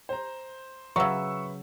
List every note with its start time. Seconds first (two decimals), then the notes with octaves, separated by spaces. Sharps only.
0.09 C5 A#5
0.96 C#3 F#3 B4 E5 C#6 E6